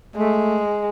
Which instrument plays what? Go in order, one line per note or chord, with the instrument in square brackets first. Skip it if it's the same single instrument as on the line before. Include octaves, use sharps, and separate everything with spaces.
[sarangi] G#3 [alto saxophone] A3